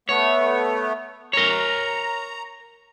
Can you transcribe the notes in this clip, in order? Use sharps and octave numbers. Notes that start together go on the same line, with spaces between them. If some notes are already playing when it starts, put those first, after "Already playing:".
A3 B3 C#5
A#4 C#5 A#5